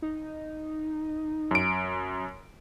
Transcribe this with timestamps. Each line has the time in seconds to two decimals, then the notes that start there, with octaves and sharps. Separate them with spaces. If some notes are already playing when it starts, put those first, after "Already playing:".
0.02 D#4
1.51 F#2 D7